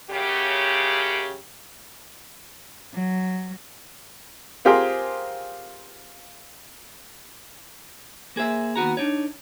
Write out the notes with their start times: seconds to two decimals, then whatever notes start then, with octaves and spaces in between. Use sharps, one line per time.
0.10 F#2 C#3 G4
2.94 F#3
4.65 C4 F4 G4 G#4 A#4 C5
8.36 A#3 G#4 C5 E5
8.76 D#2 B3 F#4 A#5
8.97 D4 D#4 C#5